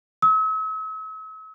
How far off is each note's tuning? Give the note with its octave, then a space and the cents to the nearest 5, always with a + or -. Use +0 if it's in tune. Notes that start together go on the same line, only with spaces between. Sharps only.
E6 -45